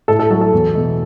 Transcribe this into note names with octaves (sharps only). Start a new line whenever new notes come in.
A2 A4
A4
F#3 A3 A4
A4
E2
B2 A3